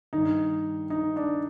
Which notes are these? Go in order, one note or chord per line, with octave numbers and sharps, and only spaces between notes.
G2 D#3 D#4
D#4
D4